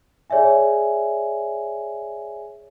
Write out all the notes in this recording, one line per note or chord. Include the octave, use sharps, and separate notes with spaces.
G#4 C#5 D5 E5 G#5